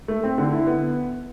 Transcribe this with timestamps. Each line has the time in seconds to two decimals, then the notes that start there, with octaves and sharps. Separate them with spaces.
0.08 A3
0.23 C4
0.38 D3
0.52 E4
0.67 B3